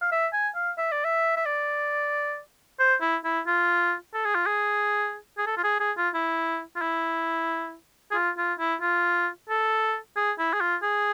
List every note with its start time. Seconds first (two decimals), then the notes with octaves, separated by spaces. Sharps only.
0.01 F5
0.12 E5
0.33 G#5
0.55 F5
0.78 E5
0.92 D5
1.04 E5
1.36 E5
1.46 D5
2.79 C5
3.01 E4
3.24 E4
3.47 F4
4.14 A4
4.25 G#4
4.35 F4
4.46 G#4
5.38 G#4
5.46 A4
5.57 F4
5.64 G#4
5.80 G#4
5.97 F4
6.14 E4
6.76 F4
6.81 E4
8.11 G#4
8.14 F4
8.38 F4
8.59 E4
8.81 F4
9.49 A4
10.16 G#4
10.39 E4
10.53 G#4
10.60 F4
10.83 G#4